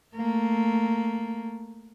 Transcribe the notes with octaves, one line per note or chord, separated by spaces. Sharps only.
A3 A#3